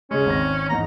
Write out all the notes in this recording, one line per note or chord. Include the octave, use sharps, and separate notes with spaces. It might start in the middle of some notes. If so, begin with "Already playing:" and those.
C#3 G#3 C#4
G#1 C4 A#6
E2 G#2 D#4 A#5